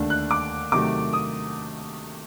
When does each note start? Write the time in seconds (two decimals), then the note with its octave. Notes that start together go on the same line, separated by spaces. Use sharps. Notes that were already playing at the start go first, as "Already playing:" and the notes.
Already playing: D#2 D3 A3 D4
0.10 F#6
0.31 D6
0.72 C3 D#3 F#3 A3 D6
1.13 D#6